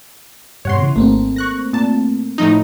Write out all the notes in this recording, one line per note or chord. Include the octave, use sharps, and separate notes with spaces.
G2 B2 C#5 F#5 C6
C#3 E3
G#1 A3 A#3 C4
C#6 F#6 A#6
A#2 A5
A2 F3 D#4